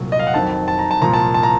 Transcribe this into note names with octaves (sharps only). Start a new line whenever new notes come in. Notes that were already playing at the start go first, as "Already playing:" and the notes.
Already playing: C2 A#2 F#3
D#5
F5
F#5
F2 D#3 F#3 A5
A5
A#5
A5
C2 A#2 F3 A#5
A5
A5
A#5